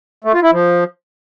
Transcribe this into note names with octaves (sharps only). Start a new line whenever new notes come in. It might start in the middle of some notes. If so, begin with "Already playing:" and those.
A3
F4
E4
F3